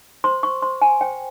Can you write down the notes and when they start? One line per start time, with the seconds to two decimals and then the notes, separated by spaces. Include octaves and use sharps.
0.24 C5 C6
0.43 C#6
0.62 C5 C6
0.82 G#5
1.01 C5 G5